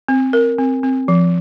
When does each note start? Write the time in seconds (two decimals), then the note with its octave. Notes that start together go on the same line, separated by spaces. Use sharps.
0.08 C4
0.33 A#4
0.59 C4
0.83 C4
1.08 F3